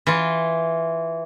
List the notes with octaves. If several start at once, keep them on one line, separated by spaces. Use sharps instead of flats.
E3 F4